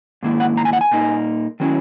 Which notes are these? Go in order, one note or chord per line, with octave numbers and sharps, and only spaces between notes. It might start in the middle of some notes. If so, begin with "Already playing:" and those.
G#2 D#3 A#3 E4
F#5
A#5
G#5
F#5
G#5
A#2 A#3 D#4
D#3 F#3 C#4 E4